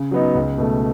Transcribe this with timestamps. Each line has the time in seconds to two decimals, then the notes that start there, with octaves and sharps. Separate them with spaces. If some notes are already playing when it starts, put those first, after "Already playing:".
Already playing: C#3
0.11 F#3 B3 D#4
0.35 C#2
0.58 B2 A3